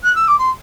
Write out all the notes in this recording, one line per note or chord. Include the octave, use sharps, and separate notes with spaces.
F#6
E6
D6
C6